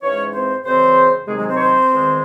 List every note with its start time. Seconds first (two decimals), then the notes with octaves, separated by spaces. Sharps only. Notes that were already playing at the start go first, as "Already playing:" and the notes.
0.02 G#2 E3 G#3 C#4 C#5
0.33 C4 C5
0.64 F#2 C#3 E3 G#3 C4 C5
1.27 C3 D#3 F#3 G#3 G#4
1.37 G#3 G#4
1.48 C4 C5
1.54 C#5
1.59 C4 C5
1.89 E2 D#3 G#3